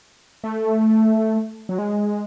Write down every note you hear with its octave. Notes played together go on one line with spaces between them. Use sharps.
A3
F#3
G#3